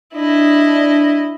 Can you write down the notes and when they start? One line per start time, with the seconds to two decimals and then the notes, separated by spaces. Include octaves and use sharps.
0.15 D4 E4 D#5